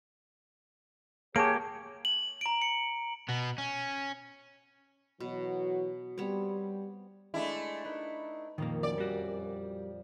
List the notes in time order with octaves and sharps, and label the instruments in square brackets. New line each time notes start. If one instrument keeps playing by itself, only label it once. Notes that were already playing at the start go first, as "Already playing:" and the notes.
[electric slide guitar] A#3 G4 [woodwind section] G#4 C#5 [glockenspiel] A5 D7
[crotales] F#7
[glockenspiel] A#5 D7
C#7
[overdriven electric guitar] B2 B3
C#4
[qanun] B2 [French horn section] E3 F#3 F#4
[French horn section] G3 [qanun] B3 C4 C#5
[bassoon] G#3 [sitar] A3 D4 E4
[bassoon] D#4 [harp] B4
[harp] F2 A#2 [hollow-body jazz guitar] D#3 F3 A#3
[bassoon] F#2 [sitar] D5
[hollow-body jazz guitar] G3 F#4